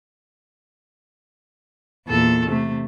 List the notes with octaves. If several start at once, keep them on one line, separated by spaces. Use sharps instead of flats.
E2 A#2 A4
C3 A3